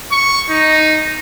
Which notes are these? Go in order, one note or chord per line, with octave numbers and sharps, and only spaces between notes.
C#6
D#4